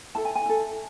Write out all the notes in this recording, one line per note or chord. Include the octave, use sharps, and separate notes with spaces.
E4 A4 A5
G#5
G#5
E4 A4